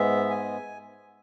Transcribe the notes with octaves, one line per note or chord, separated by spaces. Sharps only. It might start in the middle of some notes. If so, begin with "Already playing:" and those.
Already playing: G#2 G#3 B3 E5
G#5